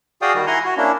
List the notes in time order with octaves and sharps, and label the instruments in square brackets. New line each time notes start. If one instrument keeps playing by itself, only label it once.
[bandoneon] F#4 G#4 D5 F5 G5 D#6
D#3 G3 F#4
E4 F#5 G#5 A#5 C6
F#4
A#3 C#4 D4 E4